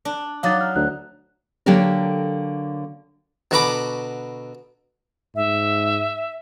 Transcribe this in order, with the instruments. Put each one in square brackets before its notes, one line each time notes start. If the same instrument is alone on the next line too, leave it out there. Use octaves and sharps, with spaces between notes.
[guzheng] D4
[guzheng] F#3 D#4 [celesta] F5 D6 A6
[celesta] F6
[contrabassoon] D2 [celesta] F#6
[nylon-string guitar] D3 F#3 A#3 G4 A4 A#4
[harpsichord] B2 D3 F#4 A#5 B5 D6
[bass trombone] G#2 [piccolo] E5